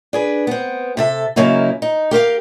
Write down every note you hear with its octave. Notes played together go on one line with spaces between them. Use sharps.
D4 G#4 B4
B3 C4
C3 A4 E5
F#2 C#3 F#3 A#3 D#4 E4
D#4
G4 A#4 C5 F5